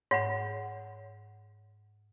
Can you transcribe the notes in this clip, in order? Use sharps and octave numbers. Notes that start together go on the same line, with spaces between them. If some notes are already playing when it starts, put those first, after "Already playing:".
G#2 C#5 F#5 B5